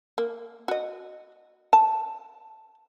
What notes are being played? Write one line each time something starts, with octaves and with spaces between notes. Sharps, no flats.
A#3
F#4 D#5
A5